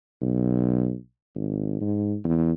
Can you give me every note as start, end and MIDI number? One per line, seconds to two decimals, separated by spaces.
0.22 0.95 35
1.35 1.81 32
1.81 2.16 44
2.24 2.52 40